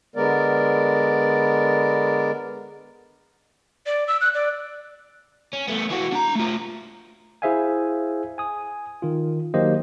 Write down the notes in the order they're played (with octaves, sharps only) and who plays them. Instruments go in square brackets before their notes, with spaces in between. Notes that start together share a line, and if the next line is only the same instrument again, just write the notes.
[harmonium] D3 G#3 B3 A#4 D5
[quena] D5
E6
F#6
D5
[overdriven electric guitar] C#4
A3 B3
E3 F#4
D4 A#5
A3 F4
[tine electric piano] E4 G#4 C5 E5 F5 G#5
G#5 D#6
D#3 F4
D#3 F#3 A#3 G4 C5 D#5